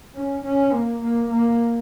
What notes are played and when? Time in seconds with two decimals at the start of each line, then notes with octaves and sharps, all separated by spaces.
0.14 C#4
0.44 C#4
0.72 A#3
1.02 A#3
1.30 A#3